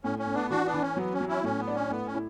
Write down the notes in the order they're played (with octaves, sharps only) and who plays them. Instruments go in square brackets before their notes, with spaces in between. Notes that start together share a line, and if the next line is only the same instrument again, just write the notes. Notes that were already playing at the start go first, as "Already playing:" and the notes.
[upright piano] A2 [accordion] C#4
[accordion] C#4
[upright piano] A2
[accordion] B3 D4
[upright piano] E3 [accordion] D4 F#4
[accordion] B3 D4
[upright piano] E3
[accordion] C#4
[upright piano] F#3 [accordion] B3
[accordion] C#4
[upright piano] F#3
[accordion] C#4 E4
[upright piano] A2 [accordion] C#4
[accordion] B3
[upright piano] D4
[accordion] C#4
[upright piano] A2 [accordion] B3
[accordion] C#4
[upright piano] E4